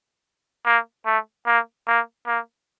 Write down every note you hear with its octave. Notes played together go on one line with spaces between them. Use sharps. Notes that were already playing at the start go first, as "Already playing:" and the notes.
A#3
A3
A#3
A#3
A#3